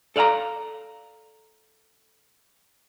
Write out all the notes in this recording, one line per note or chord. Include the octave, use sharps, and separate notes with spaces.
A4 D5 F5 G#5 A#5